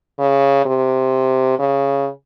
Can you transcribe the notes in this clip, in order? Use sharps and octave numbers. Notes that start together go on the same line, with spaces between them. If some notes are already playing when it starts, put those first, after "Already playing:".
C#3
C3
C#3